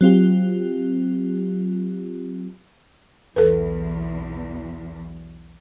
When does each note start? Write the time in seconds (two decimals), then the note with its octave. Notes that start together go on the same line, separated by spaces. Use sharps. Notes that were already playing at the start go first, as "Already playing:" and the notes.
0.01 F#3 C4 F4 G4
3.36 B1 E2 A4 B4